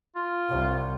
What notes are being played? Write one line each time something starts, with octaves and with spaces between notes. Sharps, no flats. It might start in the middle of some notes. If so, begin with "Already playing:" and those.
F4
C2